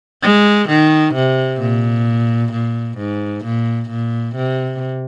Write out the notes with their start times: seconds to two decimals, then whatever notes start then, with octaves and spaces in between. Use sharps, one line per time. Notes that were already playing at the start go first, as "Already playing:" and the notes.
0.23 G#3
0.69 D#3
1.15 C3
1.60 A#2
2.52 A#2
2.98 G#2
3.45 A#2
3.90 A#2
4.36 C3